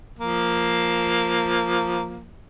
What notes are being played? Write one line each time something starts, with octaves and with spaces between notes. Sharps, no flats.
F3 A#3